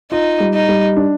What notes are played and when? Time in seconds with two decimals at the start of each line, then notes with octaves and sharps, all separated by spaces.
0.11 D#4 F4
0.40 G3
0.54 D#4
0.69 G3
0.96 D4